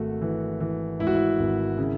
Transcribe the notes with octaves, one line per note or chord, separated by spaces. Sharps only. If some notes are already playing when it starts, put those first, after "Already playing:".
Already playing: G#1 A3 F#4 A4
E3
E3
G#2 E4
F#4
E4
G#1
C#3